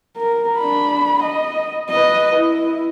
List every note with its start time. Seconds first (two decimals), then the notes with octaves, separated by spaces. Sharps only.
0.17 A#4
0.59 D4 B5
1.23 D#5
1.89 B4 D#5
2.36 E4